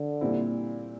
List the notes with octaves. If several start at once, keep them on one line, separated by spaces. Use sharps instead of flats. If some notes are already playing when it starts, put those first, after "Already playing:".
Already playing: D3
A#2 G3 C4 E4